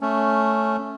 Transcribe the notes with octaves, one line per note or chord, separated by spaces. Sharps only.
A3 C#4